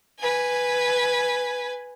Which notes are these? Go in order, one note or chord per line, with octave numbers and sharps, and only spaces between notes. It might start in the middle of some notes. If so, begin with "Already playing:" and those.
B4 G#5